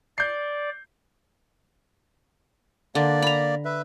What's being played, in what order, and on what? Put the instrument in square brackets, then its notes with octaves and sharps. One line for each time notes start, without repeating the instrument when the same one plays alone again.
[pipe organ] D5 [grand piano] G6 C7
[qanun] D3 [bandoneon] A#3 D5
[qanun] A#5 B5
[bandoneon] B4 E5